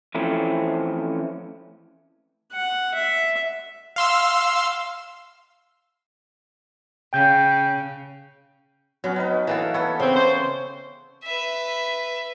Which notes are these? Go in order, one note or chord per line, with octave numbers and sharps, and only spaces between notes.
E3 F3 A3 C4 C#4
F#5
E5
F5 C6 E6
C#3 G5 G6
F#3 B3 C#4
B3 D#4 B4
E3 A#3 A4
B3 A4 C#5
C#3 C4
C5 G5
B4 E5